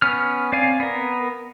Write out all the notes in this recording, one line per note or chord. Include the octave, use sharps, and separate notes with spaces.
B3 C#4 F6
C4 D5 F5 G#5
B3 A#4